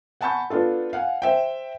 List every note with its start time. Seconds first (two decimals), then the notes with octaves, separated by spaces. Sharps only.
0.21 F#5 G#5 A5 B5 C#6 G6
0.50 B3 D4 F4 A4
0.93 F5 F#5 G#5
1.22 C5 E5 G5